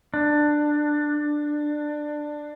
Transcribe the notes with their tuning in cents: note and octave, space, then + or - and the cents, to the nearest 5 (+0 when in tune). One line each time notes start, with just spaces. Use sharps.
D4 +15